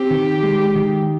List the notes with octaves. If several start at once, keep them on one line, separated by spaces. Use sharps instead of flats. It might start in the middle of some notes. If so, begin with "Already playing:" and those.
Already playing: C4 G4
D#3
G#3
D#3